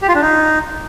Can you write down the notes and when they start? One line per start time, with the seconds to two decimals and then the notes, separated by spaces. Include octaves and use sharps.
0.02 G4
0.09 F4
0.15 D4
0.22 D#4